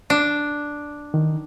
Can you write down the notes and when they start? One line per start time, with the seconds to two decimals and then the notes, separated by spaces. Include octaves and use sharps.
0.10 D4
1.14 D#3